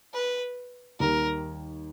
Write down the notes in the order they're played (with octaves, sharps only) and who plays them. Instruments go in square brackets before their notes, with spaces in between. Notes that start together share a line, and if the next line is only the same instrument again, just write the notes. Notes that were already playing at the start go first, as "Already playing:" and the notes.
[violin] B4
[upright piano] D#2 D#3 G3 [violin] A#4